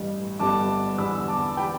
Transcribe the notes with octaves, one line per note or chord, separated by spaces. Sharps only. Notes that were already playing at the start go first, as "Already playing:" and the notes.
Already playing: A1 G2 G3
G1 G2 G3 B3 A5 D6
E2 D3 G3 B3 B5 E6
A5 D6
E3 G3 B3 G5 B5